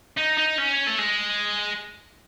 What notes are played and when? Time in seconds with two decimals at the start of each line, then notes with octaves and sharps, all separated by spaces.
0.17 D#4
0.37 D#4
0.58 C#4
0.87 A3
0.99 G#3